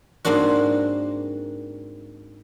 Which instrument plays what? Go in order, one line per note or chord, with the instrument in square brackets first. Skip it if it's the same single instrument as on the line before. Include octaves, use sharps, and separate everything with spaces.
[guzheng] G#2 A#3 C4 D4 F#4